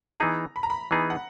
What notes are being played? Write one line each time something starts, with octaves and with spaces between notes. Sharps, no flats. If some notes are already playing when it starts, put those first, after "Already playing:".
E3 B3 D#4 G#4 A#5
B5
A#5
B5
E3 B3 D#4 G#4 A#5
F#5